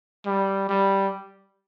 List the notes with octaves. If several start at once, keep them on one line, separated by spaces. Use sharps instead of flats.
G3
G3